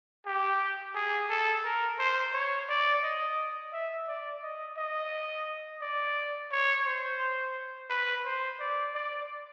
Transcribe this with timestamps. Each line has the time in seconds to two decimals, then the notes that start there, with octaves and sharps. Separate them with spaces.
0.26 G4
0.95 G#4
1.30 A4
1.65 A#4
1.99 C5
2.34 C#5
2.69 D5
3.03 D#5
3.73 E5
4.07 D5
4.42 D#5
4.77 D#5
5.81 D5
6.52 C#5
6.86 C5
7.90 B4
8.25 C5
8.60 D5
8.95 D5